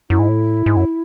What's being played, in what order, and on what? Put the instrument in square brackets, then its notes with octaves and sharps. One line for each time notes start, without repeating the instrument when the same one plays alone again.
[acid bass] F#2 [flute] E4
[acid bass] G#2
A2
G#2
F#2